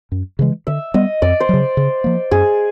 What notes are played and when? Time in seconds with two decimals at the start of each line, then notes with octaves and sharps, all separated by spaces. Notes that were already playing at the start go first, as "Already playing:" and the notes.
0.12 F#2
0.39 C#3 E3 G#3
0.67 D3 E5
0.94 G3 B3 D#5
1.22 F2 D5
1.40 C5
1.49 C#3 F#3
1.77 C#3
2.04 F3 A#3
2.31 F#2 G#4